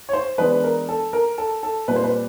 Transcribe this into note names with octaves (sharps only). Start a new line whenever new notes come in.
C#5
C5
E3 G#3 B3 D4 B4
A#4
A4
A#4
A4
A4
A#2 G3 C4 B4
C5
B4